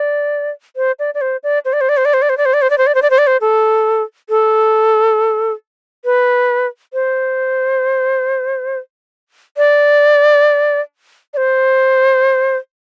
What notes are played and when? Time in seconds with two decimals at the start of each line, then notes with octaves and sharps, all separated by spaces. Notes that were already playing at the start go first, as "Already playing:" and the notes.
Already playing: D5
0.76 C5
0.99 D5
1.14 D5
1.21 C5
1.43 D5
1.65 C5
1.73 D5
1.81 C5
1.89 D5
1.97 C5
2.05 D5
2.14 C5
2.22 D5
2.29 C5
2.38 D5
2.46 C5
2.54 D5
2.62 C5
2.70 D5
2.78 C5
2.87 D5
2.95 C5
3.02 D5
3.10 C5
3.18 D5
3.27 C5
3.41 A4
4.29 A4
6.05 B4
6.93 C5
9.57 D5
11.34 D5
11.37 C5